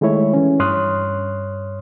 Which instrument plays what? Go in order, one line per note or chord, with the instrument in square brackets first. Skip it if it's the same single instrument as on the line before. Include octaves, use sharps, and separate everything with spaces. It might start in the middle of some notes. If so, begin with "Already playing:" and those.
[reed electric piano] D#3 G#3 A3 E4 C#5
E3 C#4
G2 C#5 C6 D#6 F6 F#6